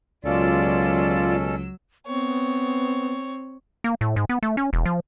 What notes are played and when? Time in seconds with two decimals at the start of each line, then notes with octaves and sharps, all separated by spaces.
0.25 C#2 B2 F#3 C#4 F4 A4 D5 E6
2.06 B3 C4 C#5
3.84 A#3
4.01 A2
4.16 G#2
4.29 B3
4.43 A3
4.57 C#4
4.73 E1
4.86 F3